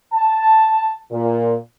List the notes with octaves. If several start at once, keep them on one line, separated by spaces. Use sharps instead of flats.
A5
A#2